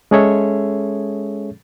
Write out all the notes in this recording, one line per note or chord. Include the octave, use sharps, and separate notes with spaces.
G#3 C#4 G#4 A4 C#5 E5